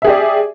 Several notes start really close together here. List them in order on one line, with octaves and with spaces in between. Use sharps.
E5 G#4 G4 D5